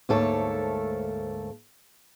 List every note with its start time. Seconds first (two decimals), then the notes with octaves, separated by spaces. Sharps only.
0.09 D2 G#2 A3 A#3 A4 C#5